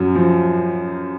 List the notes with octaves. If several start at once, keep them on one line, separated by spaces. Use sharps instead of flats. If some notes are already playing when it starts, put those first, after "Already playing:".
Already playing: F#2 F#3
F3